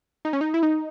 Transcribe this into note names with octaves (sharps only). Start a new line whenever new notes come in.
D#4
C#4
D#4
E4
D#4